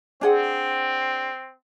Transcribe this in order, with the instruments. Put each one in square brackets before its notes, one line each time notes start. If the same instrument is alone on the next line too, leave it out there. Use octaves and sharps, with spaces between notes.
[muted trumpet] C4 [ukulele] D4 G#4 F#5